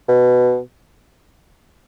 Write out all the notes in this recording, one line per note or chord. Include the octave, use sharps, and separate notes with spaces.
B2